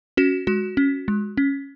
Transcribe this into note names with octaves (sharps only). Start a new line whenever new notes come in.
C#4 F#4
G#3 F#4
C#4
G#3
C#4